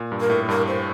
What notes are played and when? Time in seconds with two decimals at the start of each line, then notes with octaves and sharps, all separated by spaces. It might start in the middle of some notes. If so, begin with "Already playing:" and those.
Already playing: A#2
0.12 G2
0.21 A#4
0.30 A2
0.49 G2 A#4
0.67 C5